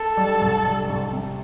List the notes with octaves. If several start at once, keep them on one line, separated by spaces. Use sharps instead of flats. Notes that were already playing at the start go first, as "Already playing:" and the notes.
Already playing: A4
G3
C2
G3
C2
C3